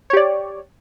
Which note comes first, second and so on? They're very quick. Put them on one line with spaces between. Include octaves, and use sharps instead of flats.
C#5 G4 D5